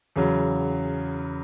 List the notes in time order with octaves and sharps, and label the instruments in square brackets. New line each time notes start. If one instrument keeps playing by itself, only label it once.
[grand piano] E2 C#3 F#3